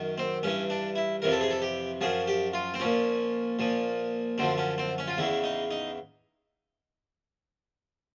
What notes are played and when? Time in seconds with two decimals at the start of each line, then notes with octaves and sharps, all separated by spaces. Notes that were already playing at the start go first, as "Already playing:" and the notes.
Already playing: F#2 D#3
0.18 C4
0.43 G2 E3 C#4
0.70 D4
0.96 E4
1.22 F2 C3 E3 A#4
1.32 A4
1.41 G#4
1.51 A4
1.62 G4
2.01 F#2 C#3 F3 G#4
2.28 G4
2.54 F4
2.74 C4
2.80 A#2 F3 C#4
3.59 A#2 F3
4.38 F#2 D3 F3 C4
4.58 C#4
4.78 C4
4.98 C#4
5.08 F4
5.18 E2 C#3 E3 E4
5.44 D#4
5.71 D#4